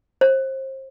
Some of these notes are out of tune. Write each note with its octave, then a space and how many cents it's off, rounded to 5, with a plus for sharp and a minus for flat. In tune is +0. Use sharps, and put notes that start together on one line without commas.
C5 +30